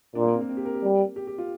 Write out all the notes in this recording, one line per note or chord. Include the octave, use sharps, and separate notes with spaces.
A#2 D4
A#3
C4
A#3
C4
G4
A#4
G4
G3
G4
G4
F4